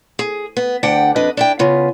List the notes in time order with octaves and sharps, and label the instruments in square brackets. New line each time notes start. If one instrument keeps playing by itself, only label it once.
[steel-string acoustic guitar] G#4
B3
D2 D4 F#5 G5
F2 D4 B4 D#5
D4 E4 G5
C#3 B3 F4